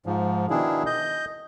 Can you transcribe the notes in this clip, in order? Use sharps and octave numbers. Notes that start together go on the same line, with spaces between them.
G#2 F3
B2 D#3 D4 E4 G#4
D#5 G6